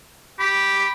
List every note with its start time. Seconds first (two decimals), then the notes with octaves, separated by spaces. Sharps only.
0.40 G4 B5